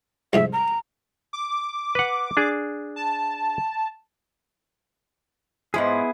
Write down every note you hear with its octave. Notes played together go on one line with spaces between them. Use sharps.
C2 F2 G#2 E5
A#5
D6
B4 F#5
D4 G#4
A5
G#2 F3 B3 E4 G#4